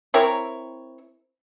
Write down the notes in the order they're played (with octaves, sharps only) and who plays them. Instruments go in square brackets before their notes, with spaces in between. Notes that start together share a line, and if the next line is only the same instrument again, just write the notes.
[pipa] C4 E4 A#4 C#5